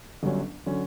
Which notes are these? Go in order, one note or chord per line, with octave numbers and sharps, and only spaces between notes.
G1 G2 D3 F#3 C#4
D3 F#3 C#4